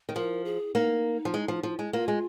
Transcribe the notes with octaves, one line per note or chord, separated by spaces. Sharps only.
D#3
F3 A#4
G#4
A#3 D#4
F3
G#3
F3
F3
G#3
A#3 F4
G#3